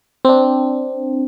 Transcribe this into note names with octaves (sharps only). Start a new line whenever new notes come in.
C4 D4